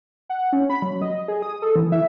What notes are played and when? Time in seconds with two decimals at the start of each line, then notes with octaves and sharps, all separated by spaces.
0.29 F#5
0.53 C#4
0.70 B5
0.82 F#3
1.02 D#5
1.28 G#4
1.42 D#6
1.62 A4
1.76 E3
1.92 E5